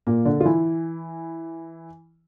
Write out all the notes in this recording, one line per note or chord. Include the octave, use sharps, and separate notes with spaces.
A#2 A#3
D3 D4
F4
E3 E4